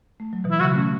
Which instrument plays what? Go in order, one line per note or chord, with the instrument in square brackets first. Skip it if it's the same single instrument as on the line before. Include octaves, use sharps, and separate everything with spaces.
[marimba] A3
F#3
B2 E3
[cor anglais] E4
[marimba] C#3 F#3 [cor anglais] F#4
[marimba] A3 C#4